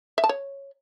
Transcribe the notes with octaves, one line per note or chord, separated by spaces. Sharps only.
E5
A5
C#5